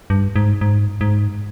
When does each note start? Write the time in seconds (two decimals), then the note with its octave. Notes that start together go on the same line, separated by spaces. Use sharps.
0.10 G2
0.36 G#2
0.61 G#2
1.01 G#2